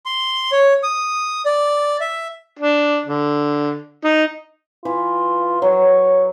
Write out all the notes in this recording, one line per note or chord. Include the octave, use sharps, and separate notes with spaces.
C6
C#5
D#6
D5
E5
D4
D3
D#4
E3 F4
F#3 C#5